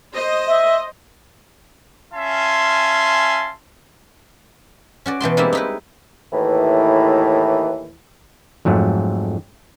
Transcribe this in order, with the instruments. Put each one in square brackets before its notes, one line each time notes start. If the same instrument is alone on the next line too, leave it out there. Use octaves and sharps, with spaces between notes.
[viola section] C5 D#5
[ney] E5
[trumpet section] C#4 F4 E5 G#5 A5 C6
[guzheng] C#4 F#4 D5
B2 E3 A5 C6
G3 G#3 A#3 C4 D4 E4
D#4 E4 B4
[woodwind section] D#2 A2 E3
[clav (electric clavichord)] F2 G#2 F#3 A3